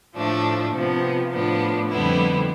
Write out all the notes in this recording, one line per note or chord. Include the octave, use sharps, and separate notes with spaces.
A2 F3 A3 D4
C3 F3 B3
A2 F3 B3 D4
F2 D3 G3 B3 E4